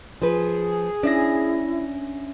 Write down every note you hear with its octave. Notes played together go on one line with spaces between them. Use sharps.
F3 G#4 B4
C#4 D4 E4 E5 A#6